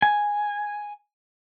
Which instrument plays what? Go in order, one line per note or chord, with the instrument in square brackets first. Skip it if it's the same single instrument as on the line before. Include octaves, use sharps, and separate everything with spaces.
[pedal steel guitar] G#5